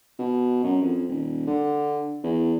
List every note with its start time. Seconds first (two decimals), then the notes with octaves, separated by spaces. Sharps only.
0.19 B2
0.64 F#2
0.82 F2
1.09 D#1
1.47 D3
2.24 E2